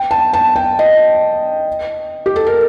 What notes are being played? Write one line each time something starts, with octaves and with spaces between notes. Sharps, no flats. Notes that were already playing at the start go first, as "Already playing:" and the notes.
Already playing: G5
A5
A5
G5
D#5
G4
A4
A#4